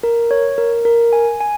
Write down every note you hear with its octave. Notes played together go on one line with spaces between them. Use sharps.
A#4
C#5
A#4
A#4
G#5
G#5